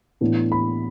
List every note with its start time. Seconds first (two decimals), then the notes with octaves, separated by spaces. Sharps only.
0.21 A2 E3 B3 D4
0.52 B5